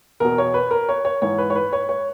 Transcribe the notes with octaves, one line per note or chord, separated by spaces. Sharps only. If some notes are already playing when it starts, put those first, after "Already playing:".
E2 B2 A#4
C#5
B4
A#4
C#5
C#5
G#2 E3 C#5
B4
C#5
B4
C#5
C#5